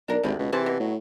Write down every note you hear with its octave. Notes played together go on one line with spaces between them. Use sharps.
B1 D4 A#4
G#1 D2 C3 B5
C#2 B2
C3 E3 G#4 C5 A5
B2
A2 F#3